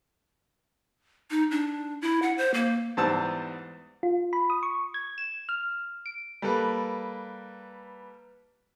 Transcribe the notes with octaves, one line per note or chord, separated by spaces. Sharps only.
D#4
D4
E4
F#5
C5
A#3
E2 G#2 G3 C5 A5 E6
F4
B5
D#6
C#6
G#6
E7
F6
D7
G3 A#3 A4 B4